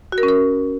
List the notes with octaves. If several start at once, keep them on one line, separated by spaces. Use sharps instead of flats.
F#4
A#4
C#4
A#4